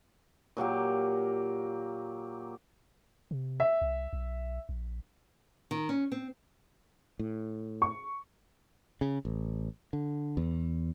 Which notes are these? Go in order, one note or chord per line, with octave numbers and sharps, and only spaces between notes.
A#2 F#3 A#3 G4
C3
E5
C2
B1
A#1
D#3
C#4
C4
A2
C#6
C#3
A1
D3
E2